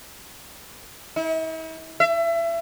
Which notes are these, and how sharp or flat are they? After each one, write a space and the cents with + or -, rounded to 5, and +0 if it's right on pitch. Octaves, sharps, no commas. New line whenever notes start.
E4 -45
E5 +30